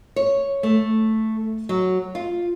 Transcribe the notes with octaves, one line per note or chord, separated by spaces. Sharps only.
C#5
A3
F#3
F4